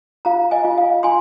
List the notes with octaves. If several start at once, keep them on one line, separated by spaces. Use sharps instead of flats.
F4 F5 A#5
D#5 G#5
F4
F5
F4 G#5 C6